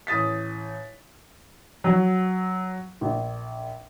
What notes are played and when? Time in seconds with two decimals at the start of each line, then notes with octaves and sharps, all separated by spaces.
0.07 A1 D#6 A6 B6
1.84 F#3
3.01 A#1